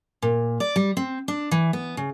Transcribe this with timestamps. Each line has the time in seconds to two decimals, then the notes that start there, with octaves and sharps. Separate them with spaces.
0.22 A#2
0.60 D5
0.76 G3
0.97 C4
1.28 D4
1.51 E3
1.73 B3
1.97 C#3